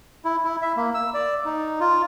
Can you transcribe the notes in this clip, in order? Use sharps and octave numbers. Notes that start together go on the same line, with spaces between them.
E4
E4
E5
A#3
E6
D5
D#4
F4